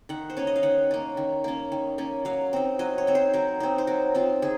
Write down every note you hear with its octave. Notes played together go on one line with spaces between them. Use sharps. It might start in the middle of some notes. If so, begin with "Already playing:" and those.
D#3 F#5
C5
A#3 C#4 C#5
D#5
F5
D#3 F#5
A#3 C#4
D#3
A#3 C#4
D#3
A#3 C#4
F#3 F5
C4 D#4
F#3 D#5
C#5
C4 D#4
C5
F#3 A#4
C4 D#4
C5
F#3 A#4
C4 D#4 F4
D#3 G#4